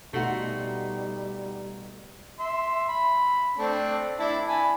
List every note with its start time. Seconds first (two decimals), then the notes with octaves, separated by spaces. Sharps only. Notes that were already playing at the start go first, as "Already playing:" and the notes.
0.13 B2 G3 A3 D#4 F#4 C6
2.39 E5 C6
2.88 B5
3.58 A3 C4 D4
4.19 D4 E4 A5
4.48 G#5 A5 B5